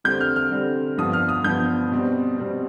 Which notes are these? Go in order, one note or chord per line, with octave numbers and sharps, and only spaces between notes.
D3 G3 C4 G6
F6
F6
D3 G3 C4
G2 F3 B3 D#6
F6
D#6
G2 F3 B3 G6
B2 G3 C4
B2 G3 C4